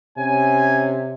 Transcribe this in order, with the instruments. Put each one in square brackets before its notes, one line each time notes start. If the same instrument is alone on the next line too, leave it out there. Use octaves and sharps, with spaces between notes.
[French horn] C3 [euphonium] C#4 [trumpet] G#5